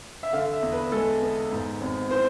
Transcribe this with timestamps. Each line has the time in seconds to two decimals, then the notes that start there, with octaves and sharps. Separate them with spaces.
0.23 E5
0.33 D3 F5
0.53 E5
0.62 E2
0.72 B4
0.92 G#3 A4
1.22 B3
1.52 G#2
1.81 G#1
2.10 E3 C5